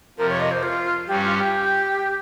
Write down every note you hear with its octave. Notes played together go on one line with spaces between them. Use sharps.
F2 C3 F3 A#4
C#5
D#5
C5
F4
G2 G3 C#4 G4
F4
G4